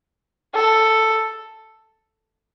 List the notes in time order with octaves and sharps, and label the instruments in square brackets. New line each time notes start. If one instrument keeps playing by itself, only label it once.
[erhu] A4